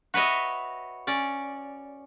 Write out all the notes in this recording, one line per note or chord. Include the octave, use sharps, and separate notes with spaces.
F#4 B4 C#5 D#5 E5
C#4 D5